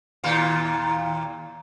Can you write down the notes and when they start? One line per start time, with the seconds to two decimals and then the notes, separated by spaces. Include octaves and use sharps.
0.24 D#2 A#2 F4